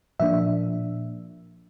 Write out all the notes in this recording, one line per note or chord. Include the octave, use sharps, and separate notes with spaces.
A#2 F3 A#3 D4 E5